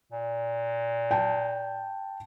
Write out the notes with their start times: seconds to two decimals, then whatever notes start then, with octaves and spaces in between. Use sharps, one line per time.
0.12 A#2
1.11 G5 A5